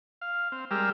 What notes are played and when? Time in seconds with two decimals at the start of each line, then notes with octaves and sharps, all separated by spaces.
0.21 F5
0.52 C4
0.71 G3 G#3 G4 A#4 E6 F6